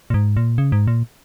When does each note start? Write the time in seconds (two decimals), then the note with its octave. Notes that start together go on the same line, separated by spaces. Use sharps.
0.10 A#2
0.14 G#2
0.37 A#2
0.58 C#3
0.72 G#2
0.87 A#2